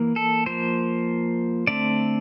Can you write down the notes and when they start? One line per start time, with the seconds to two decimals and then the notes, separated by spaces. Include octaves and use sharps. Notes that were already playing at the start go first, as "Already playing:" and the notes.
Already playing: E3 A#3
0.16 A4
0.46 F3 A#3 C5
1.67 D3 A3 C4 D5